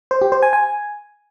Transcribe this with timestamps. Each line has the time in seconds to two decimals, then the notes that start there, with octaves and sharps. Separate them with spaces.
0.11 C5
0.21 G4
0.32 C5
0.43 G#5
0.53 G#5